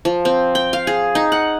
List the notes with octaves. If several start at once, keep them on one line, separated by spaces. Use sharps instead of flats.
F3
C4
G5
F5
G#4
D#4
F#5